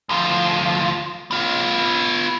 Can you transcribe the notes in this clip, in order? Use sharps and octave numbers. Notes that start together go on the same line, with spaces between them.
D2 F3
B3 F4